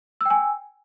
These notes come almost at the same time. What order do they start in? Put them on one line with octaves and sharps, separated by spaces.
E6 G5 G#5